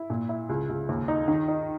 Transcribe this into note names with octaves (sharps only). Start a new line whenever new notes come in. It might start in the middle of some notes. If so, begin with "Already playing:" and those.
Already playing: E4
A#2
E4
C#2
C#2
D#2
D#4
D#3
D#4